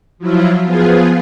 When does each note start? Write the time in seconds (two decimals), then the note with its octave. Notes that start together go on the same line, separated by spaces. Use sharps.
0.18 F3 F#3 E4 F4
0.63 F3 B3 F4 G#4